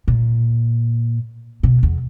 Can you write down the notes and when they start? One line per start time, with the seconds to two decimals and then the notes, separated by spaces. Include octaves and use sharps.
0.08 A#2
1.63 B2
1.83 E2